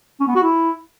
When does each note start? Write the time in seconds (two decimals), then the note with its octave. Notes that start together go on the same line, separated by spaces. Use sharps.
0.20 C#4
0.28 B3
0.35 F#4
0.43 E4